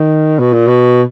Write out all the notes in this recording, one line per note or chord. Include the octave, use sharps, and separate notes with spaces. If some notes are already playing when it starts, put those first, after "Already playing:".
Already playing: D#3
B2
A#2
B2